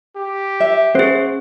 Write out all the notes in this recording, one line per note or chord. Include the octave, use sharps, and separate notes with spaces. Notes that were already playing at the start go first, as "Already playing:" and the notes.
G4
E5
C#4 G#4 C5